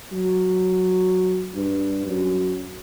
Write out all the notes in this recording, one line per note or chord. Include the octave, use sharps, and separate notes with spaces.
F#3
G2
F#2